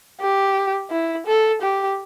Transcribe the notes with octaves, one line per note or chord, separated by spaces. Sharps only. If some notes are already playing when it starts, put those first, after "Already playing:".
G4
E4
A4
G4